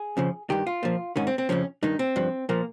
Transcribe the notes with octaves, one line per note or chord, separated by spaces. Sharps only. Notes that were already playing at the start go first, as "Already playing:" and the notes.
Already playing: G#4
F2 C#3 F3
G2 D#3 G4
F4
A#2 F3
G#2 D#3 C#4
C4
C4
F2 C#3 F3 C#4
G2 D#3 D#4
C4
G2 F3
A#2 F3 A#3